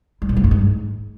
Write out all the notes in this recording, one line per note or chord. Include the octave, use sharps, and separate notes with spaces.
G3
A#2
G3
G2
G#2